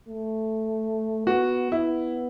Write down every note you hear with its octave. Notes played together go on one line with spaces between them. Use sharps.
A3
B3 F#4
B3 E4